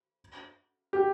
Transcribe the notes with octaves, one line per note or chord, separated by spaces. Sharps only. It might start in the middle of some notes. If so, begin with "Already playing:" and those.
G4